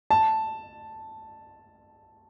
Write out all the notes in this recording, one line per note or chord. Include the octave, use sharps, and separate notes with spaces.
A5